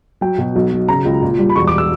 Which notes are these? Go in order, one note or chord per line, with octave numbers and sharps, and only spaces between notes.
F#3 G5
B2
B1
F#3
C#3 A#5
C#2
A#2
G3
B5
E1 C#6
D6
E6